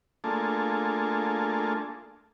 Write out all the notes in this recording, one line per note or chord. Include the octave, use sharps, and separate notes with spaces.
A3 A#3 D4 F4 G#4 A4